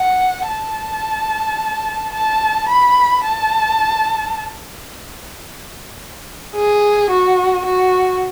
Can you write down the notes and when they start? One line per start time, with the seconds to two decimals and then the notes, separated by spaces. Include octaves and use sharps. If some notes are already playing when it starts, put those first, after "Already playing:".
Already playing: F#5
0.48 A5
2.13 A5
2.69 B5
3.24 A5
6.55 G#4
7.10 F#4
7.66 F#4